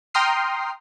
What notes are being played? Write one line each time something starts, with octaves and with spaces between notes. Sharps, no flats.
G5 A#5 C6 D#6 F6 C7